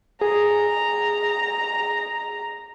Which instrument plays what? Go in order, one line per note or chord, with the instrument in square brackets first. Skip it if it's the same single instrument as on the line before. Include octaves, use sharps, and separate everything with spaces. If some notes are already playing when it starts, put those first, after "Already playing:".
[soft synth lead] G#4 [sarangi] A#5